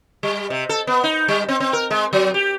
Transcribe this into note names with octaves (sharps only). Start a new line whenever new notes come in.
G3
C3
A4
B3
D#4
G3
C4
C4
A#4
G#3
F#3
G4